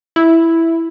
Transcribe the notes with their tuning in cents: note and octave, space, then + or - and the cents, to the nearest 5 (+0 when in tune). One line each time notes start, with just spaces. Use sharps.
E4 +0